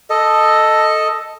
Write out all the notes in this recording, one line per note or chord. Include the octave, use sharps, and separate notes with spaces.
A4 D#5